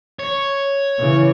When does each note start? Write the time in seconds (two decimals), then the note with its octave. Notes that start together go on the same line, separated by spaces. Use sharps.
0.19 C#5
0.99 C#3 E3